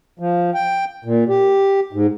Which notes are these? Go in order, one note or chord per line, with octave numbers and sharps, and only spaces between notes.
F3
G5
A#2
G4
G#2